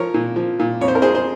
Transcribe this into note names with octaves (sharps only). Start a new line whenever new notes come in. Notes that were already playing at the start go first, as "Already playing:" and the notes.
Already playing: F3 A#4 C#5
A#2
F3
A#2
F2 C#5
C5
A#4
F2 G#4 C5
C5